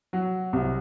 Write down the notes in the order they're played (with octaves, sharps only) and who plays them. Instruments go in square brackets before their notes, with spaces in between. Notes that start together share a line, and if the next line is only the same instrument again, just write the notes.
[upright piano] F#3
C2